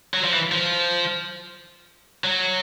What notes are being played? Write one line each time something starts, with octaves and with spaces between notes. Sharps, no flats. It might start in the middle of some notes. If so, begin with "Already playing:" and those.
F#3
F3
E3
F3
F#3